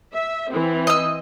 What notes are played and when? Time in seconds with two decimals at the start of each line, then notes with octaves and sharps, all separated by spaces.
0.14 E5
0.52 E3 C4
0.87 D#5 E6